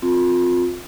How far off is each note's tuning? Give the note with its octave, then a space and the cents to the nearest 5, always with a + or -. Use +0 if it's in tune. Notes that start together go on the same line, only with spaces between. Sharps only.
C4 +0 F4 +25